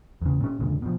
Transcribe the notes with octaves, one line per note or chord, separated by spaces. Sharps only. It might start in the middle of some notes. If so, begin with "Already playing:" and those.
E2 C#3
A#2 C#4
E1 C#2 A#2 D3
B2 F3